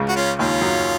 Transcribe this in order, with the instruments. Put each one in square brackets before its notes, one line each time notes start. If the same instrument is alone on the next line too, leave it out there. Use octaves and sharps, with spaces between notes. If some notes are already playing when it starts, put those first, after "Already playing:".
Already playing: [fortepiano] C#2 C#3
[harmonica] F#4
C#4 F4
[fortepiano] D#2 D#3 [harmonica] C#4 F4
[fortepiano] F#2 F#3